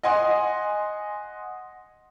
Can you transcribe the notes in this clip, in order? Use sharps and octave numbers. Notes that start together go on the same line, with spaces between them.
D#5 F#5 G#5 C6